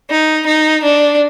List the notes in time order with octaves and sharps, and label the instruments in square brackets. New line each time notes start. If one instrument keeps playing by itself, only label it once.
[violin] D#4
D#4
D4